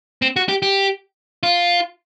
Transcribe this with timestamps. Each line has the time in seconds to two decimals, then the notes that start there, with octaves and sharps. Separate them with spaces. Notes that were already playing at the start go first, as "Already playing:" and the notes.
0.22 C4
0.36 F#4
0.49 G4
0.62 G4
1.43 F4